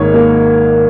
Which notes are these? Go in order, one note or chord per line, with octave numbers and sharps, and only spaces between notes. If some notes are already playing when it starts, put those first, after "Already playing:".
Already playing: G#1 G#2 A#3 C#5
A#3